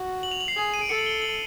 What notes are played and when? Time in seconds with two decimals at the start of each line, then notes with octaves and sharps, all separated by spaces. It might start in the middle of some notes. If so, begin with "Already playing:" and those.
Already playing: F#4
0.23 F#7
0.32 F7
0.41 F#7
0.48 C7
0.56 G#4
0.74 D#7
0.81 D7
0.89 A4 C#7
0.98 F#7
1.06 G7
1.22 F#7